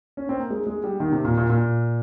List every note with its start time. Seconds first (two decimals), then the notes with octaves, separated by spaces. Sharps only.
0.17 C#4
0.29 C4
0.40 A#3
0.50 G#3
0.67 G#3
0.84 G3
1.00 D#3
1.12 C3
1.25 A#2
1.37 A#2
1.50 A#2